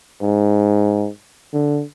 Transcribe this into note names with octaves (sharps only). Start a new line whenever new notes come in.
G#2
D3